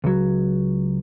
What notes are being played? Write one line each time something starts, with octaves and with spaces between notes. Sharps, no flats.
C#2 F#3